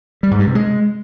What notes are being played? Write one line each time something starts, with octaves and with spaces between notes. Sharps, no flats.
G3
G#2
G2
C3
G#3